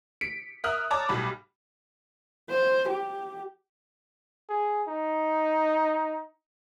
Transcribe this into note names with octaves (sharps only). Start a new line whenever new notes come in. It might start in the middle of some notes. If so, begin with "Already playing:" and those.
B6 C#7 D7
A#4 E5 D#6 F6 F#6
C#5 D5 A5 A#5 C#6 D6
B1 A2 G3 B5
C5
G4
G#4
D#4